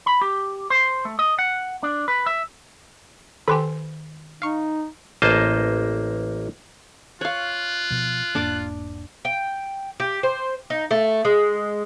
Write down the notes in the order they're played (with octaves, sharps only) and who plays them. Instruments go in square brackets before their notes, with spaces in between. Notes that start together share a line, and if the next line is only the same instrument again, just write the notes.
[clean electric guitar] B5
G4
C5
A3
D#5
F#5
D4
B4
E5
[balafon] D#3 G#5 [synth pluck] G4 B4 B5 [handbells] A4 C6
[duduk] D#4 [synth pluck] F5 C#6
[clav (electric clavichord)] A1 A#3 C5 D#5 A5
[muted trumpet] F4 [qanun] C#5 F5 [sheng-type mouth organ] F#6
[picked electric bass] B2 F3
[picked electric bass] E1 G#2 A#3 [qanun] D4 D5 D6
[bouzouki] G5
G4
C5
D#4
A3
G#3